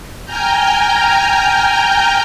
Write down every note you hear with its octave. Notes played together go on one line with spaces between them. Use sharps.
G5 G#5 A#5 F6 G6